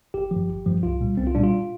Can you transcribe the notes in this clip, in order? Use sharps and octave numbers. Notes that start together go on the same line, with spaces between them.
G1 G4
G2 F3
G1
G2 F3
C2 F4
A#2 G3
C2 C4
F4
A#2 G3 D4
F4